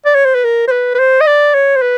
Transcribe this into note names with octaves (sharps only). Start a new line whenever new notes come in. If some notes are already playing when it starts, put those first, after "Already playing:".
D5
C#5
C5
B4
A#4
C5
B4
B4
C5
D#5
D5
C#5
C5
B4